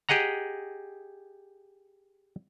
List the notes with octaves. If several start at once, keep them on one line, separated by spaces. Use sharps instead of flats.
G4 G#4 D#5 F#5 A#5